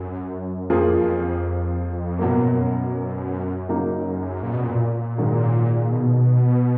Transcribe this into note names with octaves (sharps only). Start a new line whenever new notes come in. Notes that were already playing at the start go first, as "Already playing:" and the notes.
Already playing: F#2
F2 F3 A#3 F4 G#4
F#2 B2 F#3 A#3
C#3 F#3 A#3 D#4
A#2
B2
A#2
G#2 D#3 F#3
B2